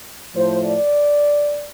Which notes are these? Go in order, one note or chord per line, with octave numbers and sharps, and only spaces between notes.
A2 F3 A3 C5
D5